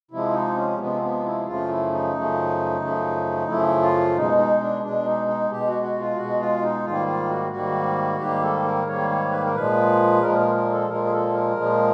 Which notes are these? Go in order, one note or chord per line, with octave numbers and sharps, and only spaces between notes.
C3 F3 G#3 E4
D#4
C#4
C3 F3 G#3 B3
C4
B3
E4
F#2 C#3 F3 A3 F4
E4
D#4
F#2 C#3 F3 A3
F#2 C#3 F3 A3
F#2 C#3 F3 A3 E4
F4
B2 G#3 D#4
D#4
D4
B2 G#3 D4
D#4
D#4
B2 G#3 G4
F#4
F#4
F4
B2 G#3 F#4
F4
D#4
G#2 D#3 G3 A#3 F4
F4
F#4
G#2 D#3 G3 A#3 F#4
G#2 D#3 G3 A#3 G4
A4
A#4
G#2 D#3 G3 A#3 C#5
C#5
B4
A#4
A#2 F3 G#3 B4
A#2 F3 G#3 A#4
A#4
A#4
A4
A#2 F3 G#3 A#4
G#4
A4
A#4
A#2 F3 G#3